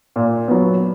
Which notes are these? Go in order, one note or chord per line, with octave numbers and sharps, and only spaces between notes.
A#2
F#3 B3